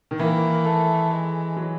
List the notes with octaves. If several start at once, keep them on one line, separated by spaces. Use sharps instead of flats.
D#3
E3 A#3
A3
G#3
F#3